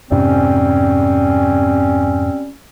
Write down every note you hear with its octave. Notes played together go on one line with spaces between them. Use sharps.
F2 G#2 C3 G3 C4 C#4